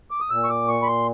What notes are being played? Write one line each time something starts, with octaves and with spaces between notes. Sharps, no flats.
D6
D#6
A#2 E6
C#6
D6
C#6
B5
C6